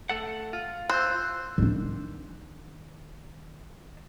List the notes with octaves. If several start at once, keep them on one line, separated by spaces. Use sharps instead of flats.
A3 A4 F#5
F4
C5 E6 F#6
D#3 D4